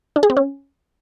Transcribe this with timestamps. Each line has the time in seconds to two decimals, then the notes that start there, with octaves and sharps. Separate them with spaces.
0.16 D4
0.23 G#4
0.30 C4
0.37 C#4